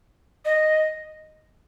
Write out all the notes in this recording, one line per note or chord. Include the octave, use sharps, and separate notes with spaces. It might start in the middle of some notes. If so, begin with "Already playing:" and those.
D#5